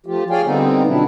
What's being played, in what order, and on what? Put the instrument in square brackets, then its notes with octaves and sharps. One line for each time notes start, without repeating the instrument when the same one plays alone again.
[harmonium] F3 A3 F4 G4
G#4 C#5 D5 F5 G5 G#5
D3 G3 B3 C4 D#4
B2 F3 F#3 D4 E4